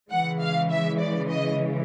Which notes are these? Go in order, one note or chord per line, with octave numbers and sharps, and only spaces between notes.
C#3 E3 G#3 F#5
F5
E5
D5
D#5